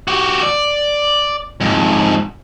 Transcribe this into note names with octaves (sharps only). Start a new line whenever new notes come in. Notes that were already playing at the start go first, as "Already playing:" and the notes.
F#4 G4
D5
F2 G#2